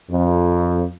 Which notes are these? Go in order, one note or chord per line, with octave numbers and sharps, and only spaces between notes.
F2